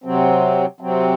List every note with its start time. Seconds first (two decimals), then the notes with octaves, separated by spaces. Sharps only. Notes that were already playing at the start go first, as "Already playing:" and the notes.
0.04 C3 F#3 C4
0.80 C3 F#3 C4